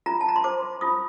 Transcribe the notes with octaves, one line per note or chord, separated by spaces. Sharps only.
F4 A#5
A5
A#5
C6
C5 D6
F4 D#6